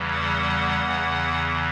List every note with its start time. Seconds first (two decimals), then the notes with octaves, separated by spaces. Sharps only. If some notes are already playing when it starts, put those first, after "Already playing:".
Already playing: E2 C#3 E3 G3
0.12 F#5
0.85 E2 C#3 E3